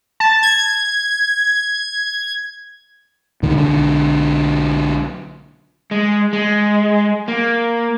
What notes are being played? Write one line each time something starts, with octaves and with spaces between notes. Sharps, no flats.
A5
G#6
C#2 A#2 D3 D#3
B1 D3
G#3
G#3
A#3